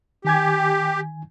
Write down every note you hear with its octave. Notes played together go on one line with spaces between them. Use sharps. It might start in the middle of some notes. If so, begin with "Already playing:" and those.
D#3 G4 G#5 G#6